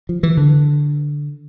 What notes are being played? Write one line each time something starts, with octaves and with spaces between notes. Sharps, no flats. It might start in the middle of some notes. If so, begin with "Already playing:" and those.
F3
E3
D3